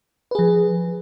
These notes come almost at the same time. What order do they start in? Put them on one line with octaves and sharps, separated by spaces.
B4 G#4 F3